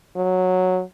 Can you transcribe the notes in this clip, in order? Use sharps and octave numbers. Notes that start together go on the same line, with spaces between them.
F#3